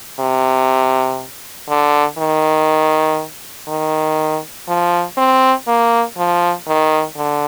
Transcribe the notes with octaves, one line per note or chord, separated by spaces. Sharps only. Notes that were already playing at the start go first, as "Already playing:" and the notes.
C3
D3
D#3
D#3
F3
C4
A#3
F3
D#3
D3